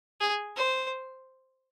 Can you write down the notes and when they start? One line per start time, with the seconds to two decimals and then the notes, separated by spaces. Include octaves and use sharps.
0.21 G#4
0.56 C5